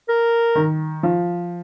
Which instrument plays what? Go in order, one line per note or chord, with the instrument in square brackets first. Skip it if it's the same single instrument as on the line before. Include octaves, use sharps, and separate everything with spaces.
[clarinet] A#4
[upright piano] D#3
F3